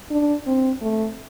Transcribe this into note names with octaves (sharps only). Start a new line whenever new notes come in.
D4
C4
A3